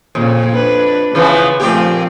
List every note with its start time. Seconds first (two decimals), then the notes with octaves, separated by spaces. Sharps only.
0.15 F2 A#2 C#3
0.54 D4 B4
1.15 C#3 E3 F3 B3
1.60 A#2 F3 A3 C4 G4